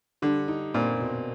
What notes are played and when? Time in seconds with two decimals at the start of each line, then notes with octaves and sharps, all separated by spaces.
0.22 D3 G3
0.48 D#4
0.74 A#2 C4
1.00 B2